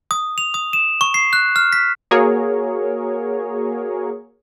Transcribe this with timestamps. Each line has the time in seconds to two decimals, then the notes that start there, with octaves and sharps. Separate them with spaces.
0.11 D#6
0.38 F7
0.54 D#6
0.73 E7
1.01 C#6
1.14 C7
1.33 F#6
1.56 F6
1.73 B6
2.11 A#3 F#4 G#4 A#4 C#5